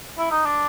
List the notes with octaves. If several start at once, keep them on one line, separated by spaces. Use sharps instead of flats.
E4
D#4
D4